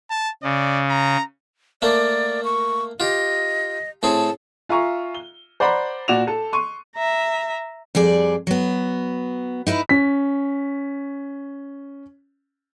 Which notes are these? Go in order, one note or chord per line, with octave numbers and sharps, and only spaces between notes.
A5
C#3 D5
A#5
A3 A#3 D5
C#6
F4 G4 D#5
A2 C4 G#4 A5
F4 E5 F5 G#5 A#5 C#6
G7
C5 D5 F#5 A#5 B5
A#2 F#4 D5 E7 F7
A4 A5
C6 C#6 D#7
E5 A#5
F2 G3 G#4 D5
F#3 B3
D#4 E4 A#4 B4
C#4 B6